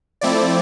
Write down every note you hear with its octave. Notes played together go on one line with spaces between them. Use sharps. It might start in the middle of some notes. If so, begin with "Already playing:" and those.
F3 A3 C4 E4 D5